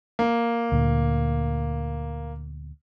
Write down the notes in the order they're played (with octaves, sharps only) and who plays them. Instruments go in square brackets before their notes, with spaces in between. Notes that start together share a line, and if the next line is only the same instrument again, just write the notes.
[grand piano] A#3
[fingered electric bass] D2 A#2